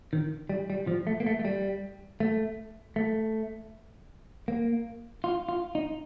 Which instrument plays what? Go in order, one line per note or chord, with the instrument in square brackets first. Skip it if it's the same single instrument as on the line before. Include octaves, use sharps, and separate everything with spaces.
[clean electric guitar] D#3
G3
G3
F3
A3
A#3
A3
A3
G3
A3
A3
A#3
F4
F4
D#4